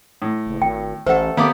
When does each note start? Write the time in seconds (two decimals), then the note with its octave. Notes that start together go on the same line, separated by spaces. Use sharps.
0.22 A2
0.47 F#1
0.62 G#1 G5
1.06 A1 A3 A4 C5 F#5
1.37 D#3 A#3 B3 G4 D5 D6